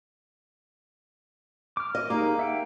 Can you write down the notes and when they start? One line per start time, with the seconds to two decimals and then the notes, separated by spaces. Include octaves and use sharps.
1.77 D6 F6
1.95 D#5
2.10 A#3 D#4 G4 G#4
2.39 E5 F#5 G5